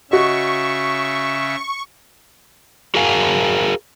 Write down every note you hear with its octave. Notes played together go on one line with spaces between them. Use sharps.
C#3 F#4 D#5 E5 C#6
F#4 G#4 A#4 F5 G#5